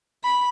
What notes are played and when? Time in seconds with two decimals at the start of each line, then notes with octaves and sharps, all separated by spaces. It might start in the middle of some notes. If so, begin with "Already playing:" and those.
0.24 B5